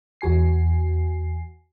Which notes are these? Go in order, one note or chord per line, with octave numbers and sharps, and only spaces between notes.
E2 F#4 G#5 C7